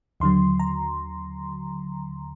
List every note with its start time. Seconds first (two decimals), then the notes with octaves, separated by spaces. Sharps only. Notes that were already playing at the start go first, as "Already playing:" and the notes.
0.20 D#2 D3 F#3 C6
0.60 A#5